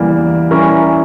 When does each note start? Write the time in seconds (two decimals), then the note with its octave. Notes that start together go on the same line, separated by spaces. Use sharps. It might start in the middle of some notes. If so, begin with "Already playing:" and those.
Already playing: E2 C#3 E3 G3 A#3
0.51 E3 G3 C#4 E4 A#4